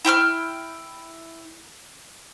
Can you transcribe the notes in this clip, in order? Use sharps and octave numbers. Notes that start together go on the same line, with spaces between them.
E4 G5 C6 F6